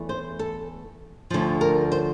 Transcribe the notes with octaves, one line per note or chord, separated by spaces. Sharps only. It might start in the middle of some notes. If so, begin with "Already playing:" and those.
Already playing: E2 E3 A3
C5
A4
D2 D3 F3
A#4
C5